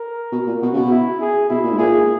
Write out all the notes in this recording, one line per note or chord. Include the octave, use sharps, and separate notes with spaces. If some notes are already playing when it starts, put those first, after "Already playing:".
Already playing: A#4
B2
A#2
B2 F#4
C#3
B2
E4
G#4
B2 E4
A#2
G#2
A#2 G#4